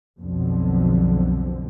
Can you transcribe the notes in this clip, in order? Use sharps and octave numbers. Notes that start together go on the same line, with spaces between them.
B1 F2 D3